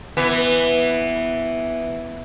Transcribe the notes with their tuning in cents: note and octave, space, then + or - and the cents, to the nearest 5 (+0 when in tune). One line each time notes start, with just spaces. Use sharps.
E3 +0 B3 +0